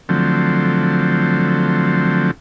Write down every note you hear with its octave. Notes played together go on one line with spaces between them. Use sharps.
D3 F3 F#3 A3 C4